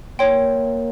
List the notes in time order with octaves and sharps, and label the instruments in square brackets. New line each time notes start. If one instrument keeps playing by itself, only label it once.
[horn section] A#3 [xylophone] C#5 G5 C6